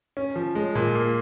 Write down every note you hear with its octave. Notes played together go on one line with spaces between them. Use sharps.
C#4
F3
G#3
A#2
A#3